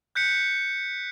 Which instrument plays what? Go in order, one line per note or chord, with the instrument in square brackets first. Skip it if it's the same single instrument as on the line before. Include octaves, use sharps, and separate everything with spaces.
[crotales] F#6 G6 B6 C#7